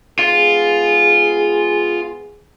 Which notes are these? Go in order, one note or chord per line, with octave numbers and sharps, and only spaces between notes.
G#2 B3 F4 G#4